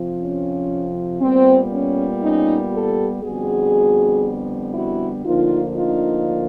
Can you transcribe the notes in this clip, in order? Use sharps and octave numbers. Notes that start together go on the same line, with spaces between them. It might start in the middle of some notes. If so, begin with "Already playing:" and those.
Already playing: F2 C3 F3
C#4
A#2 G3 B3 C4
C#4
C#4 D#4
G4 A4
F2 D3 G3 B3 F#4 G#4
E4 F#4
D2 D3 F3 A#3 D#4 F4
D#4 F4